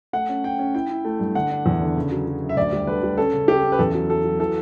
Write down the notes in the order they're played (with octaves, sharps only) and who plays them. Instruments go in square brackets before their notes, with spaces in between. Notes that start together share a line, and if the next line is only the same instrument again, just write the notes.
[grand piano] A3 F#5
C#4
C#4 G5
C#4
E4 G5
E4
A3
G2
D3 F#5
D4
E2
D3
C#3
F#3
F#3
F#2
E5
D2 D5
G3
D3 B4
G3
C#4 A4
C#3
C#4 G4
C#4
B4
E2 A4
F#3
F#3 A4
F#3
E3 A4